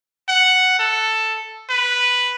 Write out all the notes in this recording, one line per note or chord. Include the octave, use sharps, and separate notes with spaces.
F#5
A4
B4